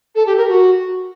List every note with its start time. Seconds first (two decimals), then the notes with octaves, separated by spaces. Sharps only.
0.15 A4
0.26 G4
0.38 A#4
0.49 F#4